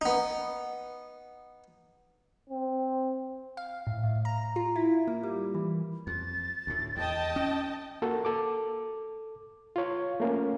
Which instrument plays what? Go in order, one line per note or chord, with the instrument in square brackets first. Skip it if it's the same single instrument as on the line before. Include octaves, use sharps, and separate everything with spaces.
[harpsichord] B3 D#4
[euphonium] C4
[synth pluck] F5
A2
A2
A#5
F4
E4
A#3
G3
E3
[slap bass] F2 [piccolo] A6
[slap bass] D2 A2
[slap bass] E2 [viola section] D#5 G5 A5
[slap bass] C#4
[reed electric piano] A#3 F#4 A4 A#4
A4 D6
F4 C#5
A3 A#3 C#4